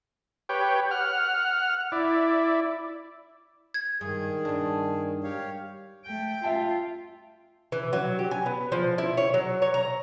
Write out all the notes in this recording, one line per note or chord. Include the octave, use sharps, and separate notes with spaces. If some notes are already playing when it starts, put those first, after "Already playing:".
G4 B4 C#5 G5
F#5 F6
E4 D5
G#6
G2 D#3 G#4
G2 D4
G4 C#5 F5
A3 G5
F4 E5 G5 A5
E3
F#3
G4
G#5
B3
F3
E4
C#5
F#3
C#5
A#5